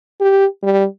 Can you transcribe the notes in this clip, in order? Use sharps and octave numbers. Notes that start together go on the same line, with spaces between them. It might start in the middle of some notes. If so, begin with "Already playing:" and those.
G4
G3